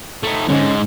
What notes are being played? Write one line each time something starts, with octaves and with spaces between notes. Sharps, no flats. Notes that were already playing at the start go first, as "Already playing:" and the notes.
A3 D#4
G#2 D3 G#3 C#4